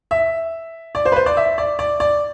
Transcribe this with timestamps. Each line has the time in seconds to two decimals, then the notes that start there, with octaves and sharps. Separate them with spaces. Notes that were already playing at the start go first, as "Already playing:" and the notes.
0.11 E5
0.95 D5
1.06 C5
1.12 B4
1.16 C5
1.26 D5
1.37 E5
1.58 D5
1.79 D5
2.00 D5